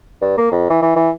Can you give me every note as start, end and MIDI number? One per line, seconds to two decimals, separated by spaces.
0.22 0.37 43
0.38 0.49 58
0.52 0.65 41
0.70 0.79 52
0.82 0.94 52
0.96 1.10 52